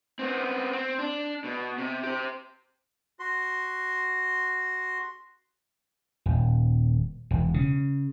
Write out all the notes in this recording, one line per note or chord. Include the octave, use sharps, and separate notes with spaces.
B3 C4
C4
D4
B2
C3
G4 C5
F#4 C6
D#1
E1
C#3